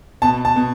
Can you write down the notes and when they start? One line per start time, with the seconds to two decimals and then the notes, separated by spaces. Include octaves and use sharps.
0.22 B2 A5
0.45 A5
0.56 B2